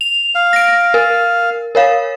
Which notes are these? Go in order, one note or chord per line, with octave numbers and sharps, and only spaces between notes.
F7
F5
A#6 D7
A#4
A#4 C#5 F5